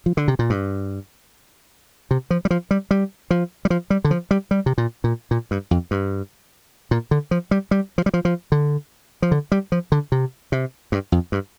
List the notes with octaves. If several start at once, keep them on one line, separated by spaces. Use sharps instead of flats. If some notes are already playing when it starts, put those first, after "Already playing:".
F3
D3
C3
A#2
G2
C3
F3
G3
F3
G3
G3
F3
G3
F3
G3
D3
F3
G3
G3
C3
A#2
A#2
A#2
G2
F2
G2
A#2
D3
F3
G3
G3
F3
G3
F3
F3
D3
F3
D3
G3
F3
D3
C3
C3
G2
F2
G2